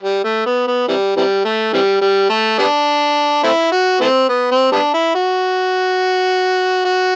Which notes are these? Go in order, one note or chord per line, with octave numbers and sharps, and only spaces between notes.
G3
A3
B3
B3
C3 E3 G3
C3 E3 G3
A3
C3 E3 G3
G3
A3
G3 B3 D4
A3 C4 E4
F#4
E3 A3 C4
B3
C4
G3 B3 D4
E4
F#4
F#4